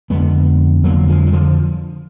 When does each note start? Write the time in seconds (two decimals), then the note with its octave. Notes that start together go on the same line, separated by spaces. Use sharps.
0.10 F2 D3 G#3 B3
0.84 F2 D3 F#3 A#3
1.08 F3 G#3
1.27 F#3
1.32 D3 F3